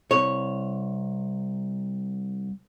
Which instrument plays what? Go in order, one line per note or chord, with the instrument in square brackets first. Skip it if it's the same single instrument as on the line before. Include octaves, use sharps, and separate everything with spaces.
[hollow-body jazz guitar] C2 C#5